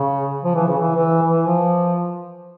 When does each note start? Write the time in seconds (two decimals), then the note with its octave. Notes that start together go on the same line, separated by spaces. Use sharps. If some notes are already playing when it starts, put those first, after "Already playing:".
Already playing: C#3
0.44 F3
0.55 E3
0.67 C#3
0.79 E3
0.96 E3
1.22 E3
1.47 F3